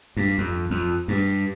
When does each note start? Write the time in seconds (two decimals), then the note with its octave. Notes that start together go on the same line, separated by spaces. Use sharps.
0.17 G2
0.38 F2
0.70 F2
1.08 G2